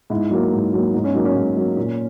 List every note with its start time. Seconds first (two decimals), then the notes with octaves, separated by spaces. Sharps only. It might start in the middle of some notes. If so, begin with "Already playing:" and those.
0.10 G#2 E4
0.31 F#3 A#3
0.52 G#2
0.73 F#3 A#3
0.93 G#2 D#4
1.04 C#4
1.15 F#3 A#3 D#4
1.25 C#4
1.35 G#2
1.57 F#3 A#3
1.77 A#2